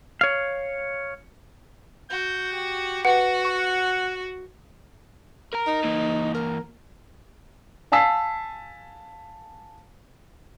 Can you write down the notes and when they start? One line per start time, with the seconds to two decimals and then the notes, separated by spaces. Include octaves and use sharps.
0.21 C#5 F5
2.10 F#4 G6
2.52 G4
3.05 F#4 B4 F#5
3.45 F#5 C#6
5.53 A#4 A#5
5.67 D#4
5.84 E3 A#3
6.34 A#4
7.92 F5 G#5 A5 E6 B6 C7